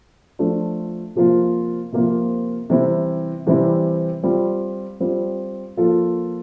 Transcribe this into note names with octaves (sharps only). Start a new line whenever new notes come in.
F3 A3 D4 F4
C3 F3 A#3 F4
C3 F3 A#3 F4
C3 E3 G3 C4 E4
C3 E3 G3 C4 E4
G3 C4 F4
G3 C4 F4
F3 A#3 F4 A4